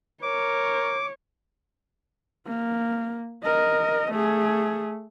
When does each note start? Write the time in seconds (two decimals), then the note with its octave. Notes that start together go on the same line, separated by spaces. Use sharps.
0.23 A#4 C#5 D6
2.46 A#3
3.44 A#4 D#5
4.12 A3 G#4